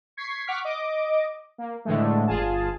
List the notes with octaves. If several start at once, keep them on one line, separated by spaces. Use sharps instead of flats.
C#6 G#6 B6 C7
F#5 C#6 D6 F6 B6
D#5 D6
A#3
A2 D3 E3 G#3 A3
G1 F4 G#4 A5